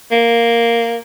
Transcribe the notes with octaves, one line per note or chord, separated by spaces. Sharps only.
A#3